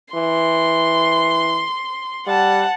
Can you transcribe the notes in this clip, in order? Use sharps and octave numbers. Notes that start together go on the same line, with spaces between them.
E3 C6
G3 F#5 A5